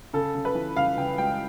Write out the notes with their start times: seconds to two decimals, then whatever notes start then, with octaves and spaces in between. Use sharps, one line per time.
0.13 C#3 A4
0.35 C#3
0.45 B4
0.55 E3
0.76 C#3 F5
0.97 C#3 G5
1.18 G#3 G5